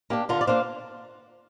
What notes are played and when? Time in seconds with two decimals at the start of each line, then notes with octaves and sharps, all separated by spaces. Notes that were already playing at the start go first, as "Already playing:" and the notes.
0.10 A#3 D4 G4
0.29 D3 F4 A#4
0.41 D5
0.47 A#3 D4 C5 F5